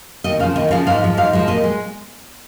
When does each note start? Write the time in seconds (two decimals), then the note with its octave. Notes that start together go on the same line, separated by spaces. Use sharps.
0.24 D#2 D#5
0.39 C#3 F3 F5
0.56 D#2 D#5
0.71 C#3 F3 F5
0.87 G#2 F5
1.02 F3 G#3
1.17 G#2 F5
1.33 F3 G#3
1.48 A#2 D#5
1.64 G#3